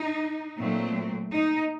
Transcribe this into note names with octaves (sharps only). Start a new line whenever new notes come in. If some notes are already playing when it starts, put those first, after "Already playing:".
Already playing: D#4
A#2 F#3 A3 C4
D#4